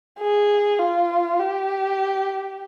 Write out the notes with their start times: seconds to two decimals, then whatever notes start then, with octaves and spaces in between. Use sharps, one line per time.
0.19 G#4
0.79 F4
1.40 G4